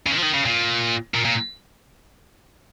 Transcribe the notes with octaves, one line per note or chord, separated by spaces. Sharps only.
C#3
D#3
F3
D#3
C#3
A#2
A#2
A#2